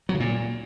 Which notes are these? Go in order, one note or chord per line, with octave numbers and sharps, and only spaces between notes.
F#3
C#3
A#2